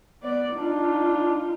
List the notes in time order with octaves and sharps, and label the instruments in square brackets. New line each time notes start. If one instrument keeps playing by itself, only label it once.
[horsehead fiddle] B3 D5
[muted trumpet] D4 [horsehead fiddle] D#4 F4